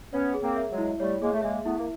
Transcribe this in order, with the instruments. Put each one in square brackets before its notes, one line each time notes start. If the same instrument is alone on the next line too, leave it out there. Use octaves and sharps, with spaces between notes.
[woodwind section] B3 C#4 [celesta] C#5
[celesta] G#4
[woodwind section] A#3 C4
[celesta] E5
[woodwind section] F#3 G#3
[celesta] E4
[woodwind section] G3 A3 [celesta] C#5
[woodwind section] G#3 A#3 [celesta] G#4
[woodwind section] A3
[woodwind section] G#3 A#3 [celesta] E5
[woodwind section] A3 B3 [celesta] E4
[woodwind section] A#3